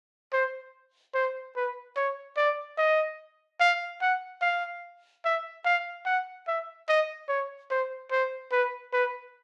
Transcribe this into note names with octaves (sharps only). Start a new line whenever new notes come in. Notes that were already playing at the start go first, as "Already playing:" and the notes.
C5
C5
B4
C#5
D5
D#5
F5
F#5
F5
E5
F5
F#5
E5
D#5
C#5
C5
C5
B4
B4